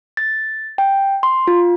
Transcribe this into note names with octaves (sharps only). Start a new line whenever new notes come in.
A6
G5
C6
F4